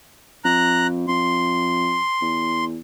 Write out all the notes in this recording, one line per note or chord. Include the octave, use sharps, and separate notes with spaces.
F2 A#5 F#6
F2 C6
E2